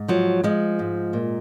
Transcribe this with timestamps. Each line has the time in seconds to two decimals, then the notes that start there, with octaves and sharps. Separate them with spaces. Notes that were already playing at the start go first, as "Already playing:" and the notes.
Already playing: G#2
0.08 F3 F#3
0.44 F3 G#3
0.79 G#2
1.13 A#2